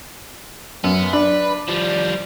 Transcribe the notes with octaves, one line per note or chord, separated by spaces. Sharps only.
F#2 B3
D4 B4
F3 G3